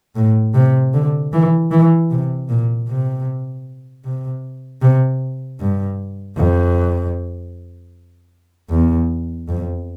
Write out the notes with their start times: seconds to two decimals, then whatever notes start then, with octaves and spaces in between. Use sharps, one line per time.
0.16 A2
0.54 C3
0.94 D3
1.33 E3
1.71 E3
2.11 C3
2.49 A#2
2.88 C3
4.05 C3
4.81 C3
5.60 G2
6.37 F2
8.70 E2
9.48 F2